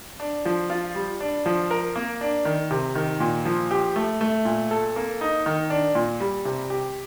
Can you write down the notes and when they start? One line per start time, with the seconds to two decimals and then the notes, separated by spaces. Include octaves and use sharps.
0.20 D4
0.45 F3
0.70 F4
0.95 G3
1.20 D4
1.46 F3
1.71 A#4
1.96 A#3
2.21 D4
2.45 D#3
2.71 C3
2.95 D#3
3.20 A#2
3.45 F3
3.71 G4
3.96 A3
4.21 A3
4.45 A#2
4.71 A4
4.96 A#3
5.21 D#4
5.46 D#3
5.70 D4
5.95 A#2
6.20 G3
6.45 C3
6.70 G4